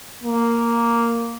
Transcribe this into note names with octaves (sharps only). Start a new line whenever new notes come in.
A#3